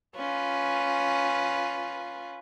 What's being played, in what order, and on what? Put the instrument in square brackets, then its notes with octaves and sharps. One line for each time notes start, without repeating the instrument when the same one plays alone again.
[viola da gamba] C#4 F4 B4